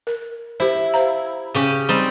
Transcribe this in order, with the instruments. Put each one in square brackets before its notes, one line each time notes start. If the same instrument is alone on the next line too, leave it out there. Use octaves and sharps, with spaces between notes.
[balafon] A#4
[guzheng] E4 [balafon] G4 C5
[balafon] C5 F5 A#5
[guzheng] C#3 C#4 G4
G3 C4 D#4